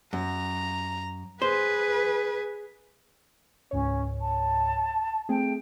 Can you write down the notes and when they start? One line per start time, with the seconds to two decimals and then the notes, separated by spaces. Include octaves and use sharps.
0.13 F#2 A#5
1.42 G#4 B4 C5
3.71 C#2 G#2 C#4 C#5
4.21 A5
5.29 A3 C4 G#4 G5